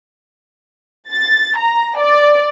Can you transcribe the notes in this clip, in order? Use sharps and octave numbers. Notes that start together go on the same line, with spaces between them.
A6
A#5
D5